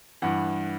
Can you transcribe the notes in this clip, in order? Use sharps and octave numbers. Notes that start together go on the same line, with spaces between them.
G2 E3 F#5